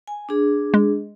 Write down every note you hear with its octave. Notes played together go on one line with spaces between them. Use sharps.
G#5
D4 G#4
G#3